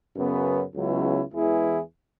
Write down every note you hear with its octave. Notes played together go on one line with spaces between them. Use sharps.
F#2 C#3 F#3 B3
C#2 C#3 F#3 B3 E4
E2 E3 G#3 E4 G#4